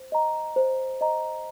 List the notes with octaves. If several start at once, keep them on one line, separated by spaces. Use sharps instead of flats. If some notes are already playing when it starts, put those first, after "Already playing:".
Already playing: C5
D#5 A#5
C5
D#5 A#5